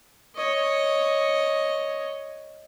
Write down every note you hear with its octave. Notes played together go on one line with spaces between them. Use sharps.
C#5 D#5